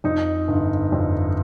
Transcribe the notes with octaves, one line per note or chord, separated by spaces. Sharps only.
F2 D#4
G1
F2